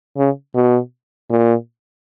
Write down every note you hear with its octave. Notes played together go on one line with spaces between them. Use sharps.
C#3
B2
A#2